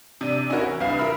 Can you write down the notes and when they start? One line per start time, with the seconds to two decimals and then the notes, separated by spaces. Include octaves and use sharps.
0.21 C3 D4
0.50 C#4 D#4 E4 F#4 A#4 C#5
0.66 E3
0.80 C2 G2 B4 F5
0.99 F4 A#4 E5 B5 F6